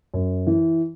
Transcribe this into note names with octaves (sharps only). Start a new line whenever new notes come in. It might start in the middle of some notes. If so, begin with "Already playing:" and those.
F#2
E3